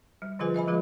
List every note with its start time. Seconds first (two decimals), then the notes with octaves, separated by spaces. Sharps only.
0.22 G3
0.39 D3 F3 F4 G#4 B4 G#5
0.54 D#5 E5 G#5 B5
0.67 F3 G#3 F4 G#4 B4